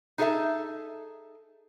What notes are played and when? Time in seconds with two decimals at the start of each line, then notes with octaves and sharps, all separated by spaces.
0.18 D#4 G#4 A4 C#5 E5 A5